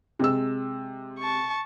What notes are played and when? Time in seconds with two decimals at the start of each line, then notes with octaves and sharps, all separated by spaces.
0.19 C3 G#3 E6
1.19 A5 C#6